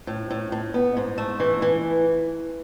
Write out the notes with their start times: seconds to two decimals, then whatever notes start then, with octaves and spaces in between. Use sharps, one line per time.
0.07 A2
0.31 A2
0.52 A2
0.74 B3
0.97 G#2
1.18 A3
1.40 E3
1.62 E3